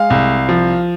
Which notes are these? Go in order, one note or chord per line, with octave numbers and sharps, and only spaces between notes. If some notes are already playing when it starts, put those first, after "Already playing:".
Already playing: G#3 F5
C2
F3